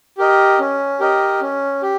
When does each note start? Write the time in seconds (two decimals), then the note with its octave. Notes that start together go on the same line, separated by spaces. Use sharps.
0.18 G4 A#4 D#5
0.59 C#4
1.00 G4 A#4 D#5
1.41 C#4
1.82 G4